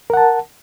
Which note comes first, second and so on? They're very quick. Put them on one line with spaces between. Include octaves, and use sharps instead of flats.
A#4 F#5 A5